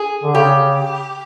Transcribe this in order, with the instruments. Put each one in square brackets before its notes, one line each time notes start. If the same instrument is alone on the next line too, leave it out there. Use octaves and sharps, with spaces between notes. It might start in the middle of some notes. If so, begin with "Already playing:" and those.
Already playing: [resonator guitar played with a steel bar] G#4
[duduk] D3
[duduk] C#3 [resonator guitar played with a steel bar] G4